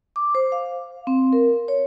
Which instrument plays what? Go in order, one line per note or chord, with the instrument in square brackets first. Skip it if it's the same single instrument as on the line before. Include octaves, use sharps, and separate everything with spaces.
[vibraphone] D6
C5
F5
C4
A#4
C#5